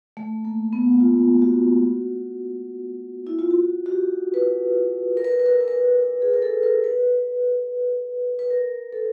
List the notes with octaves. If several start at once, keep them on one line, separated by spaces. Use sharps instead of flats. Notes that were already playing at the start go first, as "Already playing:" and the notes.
A3
A#3
B3
F4
F#4
E4
F4
F#4
F#4
G4
B4
A#4
B4
A#4
B4
A#4
B4
A#4
B4
A#4
A#4
G#4
A#4
A4
A#4
B4
B4
A#4
A4